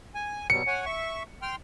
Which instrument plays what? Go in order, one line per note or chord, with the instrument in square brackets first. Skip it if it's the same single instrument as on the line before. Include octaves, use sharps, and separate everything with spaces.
[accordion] G#5
[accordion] B2 F#3 G3 [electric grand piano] C#7
[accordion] C#5 F#5 G#5
E5 C#6
G5 C6 F6